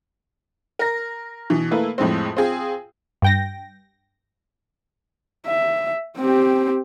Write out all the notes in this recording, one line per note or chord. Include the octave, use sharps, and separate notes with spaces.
A#4 A#6
B2 E3
A3 A#3 E4 B4
F2 A2 G#3 C4
C4 F4 G#4 G5
G2 G5 A#6
E5
C4 G4